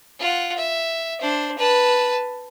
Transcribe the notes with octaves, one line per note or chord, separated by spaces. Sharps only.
F4 F#5
E5
D4 C5
B4 A5